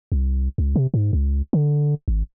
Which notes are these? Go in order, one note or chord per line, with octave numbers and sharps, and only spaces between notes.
C2
C#2
C3
G#2
C#2
D3
G#1